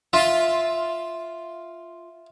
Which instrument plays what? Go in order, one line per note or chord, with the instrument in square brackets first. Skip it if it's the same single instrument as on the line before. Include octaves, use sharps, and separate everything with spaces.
[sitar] F4 [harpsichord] E5